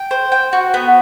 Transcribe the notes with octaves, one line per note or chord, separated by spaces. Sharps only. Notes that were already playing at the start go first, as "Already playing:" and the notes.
Already playing: G5
C5
G5
F#4
B3